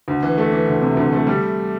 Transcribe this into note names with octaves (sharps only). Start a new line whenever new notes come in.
D2
E3
A3
E3
D2
C3
D2
A3
G3